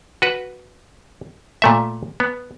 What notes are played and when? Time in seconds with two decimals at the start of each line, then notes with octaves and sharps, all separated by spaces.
0.22 F#4 B4
1.62 A#2 A3 E5
2.20 B3